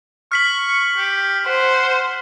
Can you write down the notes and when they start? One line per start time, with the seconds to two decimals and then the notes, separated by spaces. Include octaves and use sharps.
0.32 C#6 F6 B6 F#7
0.98 G4
1.46 C5 F#5